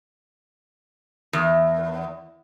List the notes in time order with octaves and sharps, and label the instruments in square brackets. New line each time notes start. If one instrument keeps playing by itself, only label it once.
[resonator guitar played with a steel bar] E2